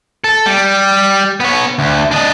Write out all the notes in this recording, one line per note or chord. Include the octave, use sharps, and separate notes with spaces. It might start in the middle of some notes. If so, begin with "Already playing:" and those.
A4
G3
B3 C#5
D2
D4 D#5